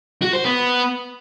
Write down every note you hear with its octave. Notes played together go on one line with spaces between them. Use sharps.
F#4
C5
B3